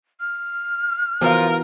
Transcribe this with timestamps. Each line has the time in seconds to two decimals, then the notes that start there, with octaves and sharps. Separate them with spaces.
0.20 F6
1.21 E3 F3 B3 F4 F#4 A#4